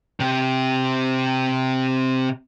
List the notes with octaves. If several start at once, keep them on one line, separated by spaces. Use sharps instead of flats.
C3 G4